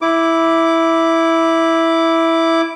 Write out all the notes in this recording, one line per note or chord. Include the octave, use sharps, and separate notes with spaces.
E4 D6